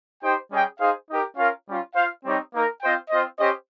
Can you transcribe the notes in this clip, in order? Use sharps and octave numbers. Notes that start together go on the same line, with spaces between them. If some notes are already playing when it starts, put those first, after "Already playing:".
D#4 G4 C5 G5
G3 C#4 G#4 D#5 G5
D#4 G#4 C5 F5
D#4 G4 A#4
C#4 F4 A#4 F5
G3 C#4 F4
F4 C5 F5
G3 C4 D#4 G4 C#5
A#3 D#4 A#4
C4 F4 C5 D#5 G5
C4 F4 C5 D#5
C#4 G4 C5 D#5